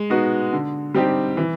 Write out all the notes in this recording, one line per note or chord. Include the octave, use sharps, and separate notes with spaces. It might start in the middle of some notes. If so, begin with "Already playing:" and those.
Already playing: G#3
B3 D#4 F#4
D3
G3 C4 D#4 G4
E3